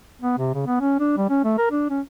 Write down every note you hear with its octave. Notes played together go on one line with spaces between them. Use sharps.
B3
C3
C#3
B3
C#4
D4
G3
C#4
A3
A#4
D4
C#4